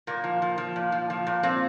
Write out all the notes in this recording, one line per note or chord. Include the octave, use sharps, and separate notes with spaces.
A#2 A#3
F3
F3
F3
A#2
F3
F3
A#2
A#2 C4